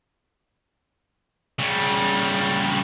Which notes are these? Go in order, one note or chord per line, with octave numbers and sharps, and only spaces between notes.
C#3 G3